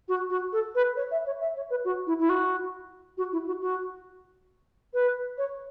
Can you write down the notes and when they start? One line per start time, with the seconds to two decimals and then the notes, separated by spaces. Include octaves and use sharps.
0.08 F#4
0.30 F#4
0.53 A4
0.75 B4
0.96 C#5
1.11 E5
1.26 C#5
1.41 E5
1.56 C#5
1.70 B4
1.85 F#4
2.07 E4
2.19 E4
2.29 F#4
3.17 F#4
3.32 E4
3.47 F#4
3.61 F#4
4.94 B4
5.38 C#5